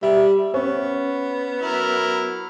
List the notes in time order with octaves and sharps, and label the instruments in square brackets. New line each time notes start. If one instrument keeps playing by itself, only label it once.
[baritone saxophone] G3 [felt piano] E5
[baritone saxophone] B3 [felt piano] C#4
[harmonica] F#3 E4 A#4